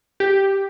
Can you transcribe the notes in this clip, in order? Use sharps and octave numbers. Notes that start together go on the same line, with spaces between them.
G4